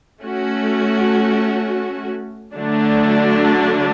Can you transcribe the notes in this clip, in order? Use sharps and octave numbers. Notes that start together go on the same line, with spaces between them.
A3 C#4 F#4
D3 F#3 A3 D4